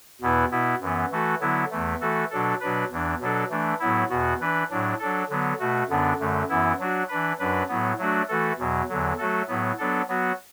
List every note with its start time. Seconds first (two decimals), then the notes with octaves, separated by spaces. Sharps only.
0.21 E2 B2 B3 E4 B4
0.51 B2 B3 E4
0.81 F#2 E3 B3
1.11 E3 A3 F#4 A4
1.41 D3 F#3 B3 E4
1.70 E2 E3 A3
2.00 E3 A3 F#4 A4
2.30 B2 F#3 D4 A4
2.60 B2 F#3 D4 B4
2.91 E2 E3 D4
3.20 B2 F#3 D4 A4
3.50 E3 A3 D4
3.80 A2 F#3 B3 E4
4.10 E2 B2 B3 F#4
4.40 E3 D4 B4
4.70 A2 F#3 D4
4.99 F#3 D4 A4
5.29 D3 F#3 B3
5.59 B2 A3 F#4
5.89 F#2 D3 B3 D4
6.19 F#2 D3 A3
6.49 F#2 E3 B3 E4
6.79 F#3 D4 F#4
7.08 E3 D4 B4
7.39 F#2 F#3 D4 B4
7.68 A2 F#3 B3
7.98 F#3 A3 D4 F#4
8.28 E3 A3 F#4 A4
8.58 E2 B2 F#3
8.89 E2 D3 F#3
9.18 F#3 A3 F#4 A4
9.48 A2 F#3 B3
9.78 F#3 B3 D4 A4
10.08 F#3 B3 F#4